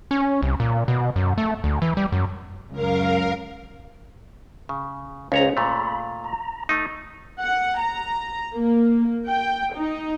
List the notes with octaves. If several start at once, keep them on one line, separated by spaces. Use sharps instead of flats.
C#4
C2
A#2
B2
F#2
A3
D2
E3
G3
F#2
C#2 F#2 A#4 F5
C#3
C#2 C#4 G#4 C5 C#5 A#5
A#2 A3 B5
A#5
A3 D#4
F#5
A#5
A#3
G5
D#4